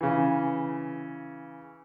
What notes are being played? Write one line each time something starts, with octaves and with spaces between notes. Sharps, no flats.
C#3 E3